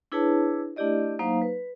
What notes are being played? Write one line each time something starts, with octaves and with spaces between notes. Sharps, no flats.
D4 E4 G#4 B4 C#5 A5
A3 D4 E4 G4 D5 D#5
F#3 A#3 D#4 C5 F5
B4